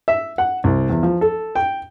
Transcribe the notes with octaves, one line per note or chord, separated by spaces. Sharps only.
E5
F#5
C2
E2
F3
A4
G5